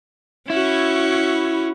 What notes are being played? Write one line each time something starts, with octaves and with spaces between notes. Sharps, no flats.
C#4 E4 F#4